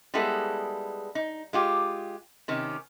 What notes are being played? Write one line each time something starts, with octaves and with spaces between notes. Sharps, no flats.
G3 G#3 B3 E4 G#4 A4
D#4
G#3 F4 G4
C3 D#3 C#4